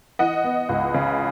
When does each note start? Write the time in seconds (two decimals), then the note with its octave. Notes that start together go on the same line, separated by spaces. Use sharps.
0.19 E3 D#5 F#5
0.44 B3
0.69 C#2
0.94 C#3